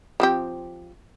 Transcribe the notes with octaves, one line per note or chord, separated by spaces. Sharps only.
F3 C4 G4